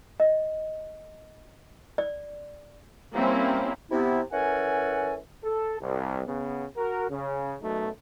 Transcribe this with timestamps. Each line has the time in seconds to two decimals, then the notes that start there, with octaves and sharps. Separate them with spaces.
0.20 D#5
1.98 D5
3.14 G3 A#3 C4 C#4 E4
3.90 C3 B3 E4
4.32 E3 C#4 A4 A#4 F#5 G#5
5.44 A4
5.80 C2
6.26 C#3 B3
6.76 F#4 A#4
7.10 C#3
7.62 F#2 B2 F#3 A3 D#4